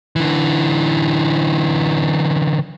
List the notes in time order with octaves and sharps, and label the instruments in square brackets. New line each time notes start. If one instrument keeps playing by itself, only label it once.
[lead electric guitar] D3 E3